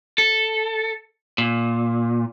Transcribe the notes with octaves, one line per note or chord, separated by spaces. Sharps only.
A4
A#2